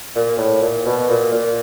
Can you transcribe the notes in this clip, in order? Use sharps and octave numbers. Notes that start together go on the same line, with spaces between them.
A#2
A2
A#2
B2
A#2
A#2